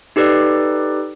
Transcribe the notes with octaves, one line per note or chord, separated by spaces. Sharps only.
D#4 G4 A4 B4 D5